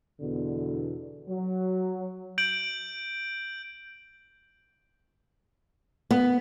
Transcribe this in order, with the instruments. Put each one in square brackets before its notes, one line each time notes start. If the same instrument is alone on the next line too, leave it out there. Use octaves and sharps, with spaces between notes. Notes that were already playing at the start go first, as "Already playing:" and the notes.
[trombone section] E2 B2 D3
F#3
[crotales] G6 D7 F#7
[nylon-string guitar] B3